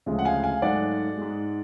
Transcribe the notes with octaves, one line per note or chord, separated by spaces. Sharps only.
D2 C#3 F3 G#3
F#5
F5 G#5
F5 G#5
G#2 F#3 A3 D5 F#5
G#2 G#3